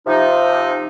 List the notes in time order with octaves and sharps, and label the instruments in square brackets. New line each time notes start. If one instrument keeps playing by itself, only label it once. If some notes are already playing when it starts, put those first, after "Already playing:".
[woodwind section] C3 F3 D#4